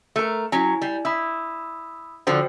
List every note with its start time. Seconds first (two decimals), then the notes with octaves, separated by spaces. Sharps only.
0.16 A3 A#4
0.52 F#3 C#4 E4 G#5
0.82 G3
1.05 E4 B5 D#6 E6
2.27 D3 F3 D4 F#4 C5 G5